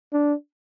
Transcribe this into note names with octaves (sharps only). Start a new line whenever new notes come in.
D4